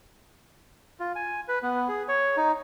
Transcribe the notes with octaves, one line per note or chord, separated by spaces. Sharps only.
F4
G#5
B4
B3
G#4
C#5
D#4